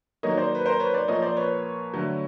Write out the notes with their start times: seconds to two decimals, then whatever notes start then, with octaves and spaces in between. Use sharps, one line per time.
0.23 D#3 F#3 A#3 C#5 D#5
0.37 C5 D5
0.55 B4
0.66 A#4 C5
0.80 B4 C#5
0.94 C5 D5
1.08 A#2 F3 A#3 C#5 D#5
1.22 C5 D5
1.37 B4 C#5
1.93 D3 F#3 A3